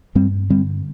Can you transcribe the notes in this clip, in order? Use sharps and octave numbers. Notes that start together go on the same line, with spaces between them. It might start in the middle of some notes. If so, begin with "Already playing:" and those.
G2 G3 C4
D3 G3 C4